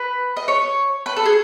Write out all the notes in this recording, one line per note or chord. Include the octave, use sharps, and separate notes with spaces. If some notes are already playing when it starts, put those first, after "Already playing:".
Already playing: B4
D#5
C#5
B4
A4
G#4